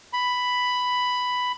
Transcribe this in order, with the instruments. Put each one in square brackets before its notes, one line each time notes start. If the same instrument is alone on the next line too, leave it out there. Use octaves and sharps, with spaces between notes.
[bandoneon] B5